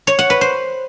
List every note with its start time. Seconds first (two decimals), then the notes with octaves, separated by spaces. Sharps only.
0.07 C#5
0.19 F#5
0.30 B4
0.41 C5